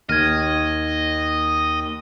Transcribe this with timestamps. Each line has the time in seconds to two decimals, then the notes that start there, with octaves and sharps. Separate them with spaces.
0.09 D#2 D#5 F6 G#6